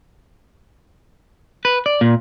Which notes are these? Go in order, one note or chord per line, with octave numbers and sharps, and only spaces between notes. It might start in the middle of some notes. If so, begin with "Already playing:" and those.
B4
D5
A#2